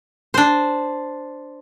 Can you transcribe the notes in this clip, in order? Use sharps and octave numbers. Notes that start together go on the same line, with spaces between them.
D4 C5